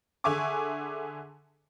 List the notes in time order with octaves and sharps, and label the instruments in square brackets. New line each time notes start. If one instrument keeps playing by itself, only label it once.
[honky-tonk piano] D3 G#4 E5 G#5 C#6 D6